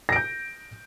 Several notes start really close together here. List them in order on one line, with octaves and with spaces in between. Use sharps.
A#6 D7 G6